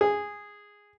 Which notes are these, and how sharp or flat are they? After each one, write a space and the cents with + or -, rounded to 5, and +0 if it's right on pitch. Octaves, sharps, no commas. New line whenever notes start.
G#4 -10